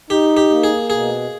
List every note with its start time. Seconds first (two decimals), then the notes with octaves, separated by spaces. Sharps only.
0.10 D#4 G4
0.37 G4
0.50 A#3
0.64 G#4
0.90 B2 G#4